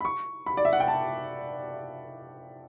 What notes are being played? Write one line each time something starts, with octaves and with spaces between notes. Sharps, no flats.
B5
C#6
B5
D5
E5
F#5
G5
A5